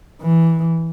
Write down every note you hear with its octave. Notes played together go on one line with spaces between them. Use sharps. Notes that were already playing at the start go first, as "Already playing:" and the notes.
E3